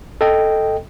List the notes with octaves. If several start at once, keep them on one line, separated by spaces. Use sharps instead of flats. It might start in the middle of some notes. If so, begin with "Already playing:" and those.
A4 D#5 G5